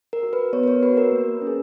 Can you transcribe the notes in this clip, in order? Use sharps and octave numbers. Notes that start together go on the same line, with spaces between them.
A#4
F#4
B4
B3 C#5
B4
C#5
F#4 B4
A#4
A#3
C#4
G#4